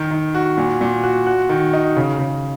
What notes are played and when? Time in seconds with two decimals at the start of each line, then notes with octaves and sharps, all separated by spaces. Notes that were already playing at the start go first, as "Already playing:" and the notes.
Already playing: D#3
0.11 D#3
0.35 F#4
0.58 A#2
0.81 A#2
1.03 F#4
1.26 F#4
1.49 D#3
1.73 D#4
1.97 C#3
2.19 C#3